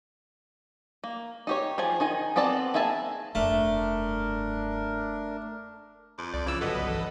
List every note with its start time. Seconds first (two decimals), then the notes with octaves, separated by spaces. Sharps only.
1.04 A#3
1.47 D#4 G4 C#5
1.78 F3 G#4 G#5
2.00 D#3 D#4 G#5
2.36 B3 C4 A4 D5 A5
2.74 A#3 G#4 E5 G#5 A5
3.35 F1 G2 A3 D4 A#4
6.18 F2
6.34 C2 D5
6.46 C#3 E3 F3 E6
6.61 G1 A2 F#3 B3 A4 B4 D#5
6.89 E3